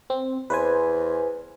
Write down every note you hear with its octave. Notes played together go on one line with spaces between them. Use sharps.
C4
E2 B4 C5 G#5